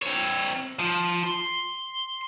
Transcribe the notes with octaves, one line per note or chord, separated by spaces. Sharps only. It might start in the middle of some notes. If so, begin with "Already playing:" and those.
C4 C#5
F3
C6